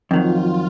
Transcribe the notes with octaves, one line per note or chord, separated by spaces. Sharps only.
F2 D#3 F#3 F4